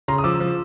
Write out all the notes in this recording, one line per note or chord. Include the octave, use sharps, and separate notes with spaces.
C#3 A#5 C6
D#6
F3 D6 E6
F3